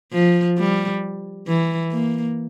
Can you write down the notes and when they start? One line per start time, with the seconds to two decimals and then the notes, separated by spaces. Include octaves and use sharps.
0.13 F3
0.58 G3
1.48 E3
1.92 A#3